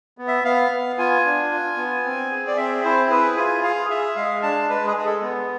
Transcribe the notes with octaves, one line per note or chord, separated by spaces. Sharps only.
B3
E5
B3 F5
B3
F4 G#5
D4
F4
B3
C4
G#4
D5
C4 E5
E4 C5
G#4 B4
F4 G#5
G#4 F5
G#4 E5
G#3 F5
D4 A5
G#3 B4
G#4
G#3 G#4
A4
B3